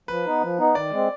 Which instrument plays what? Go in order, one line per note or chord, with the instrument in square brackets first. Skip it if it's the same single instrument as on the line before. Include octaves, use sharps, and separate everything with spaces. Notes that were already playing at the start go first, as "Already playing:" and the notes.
[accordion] F3 [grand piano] B4
[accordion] B3 D#4
F3
B3 D#4
[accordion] D#3 [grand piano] D5
[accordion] G#3 C4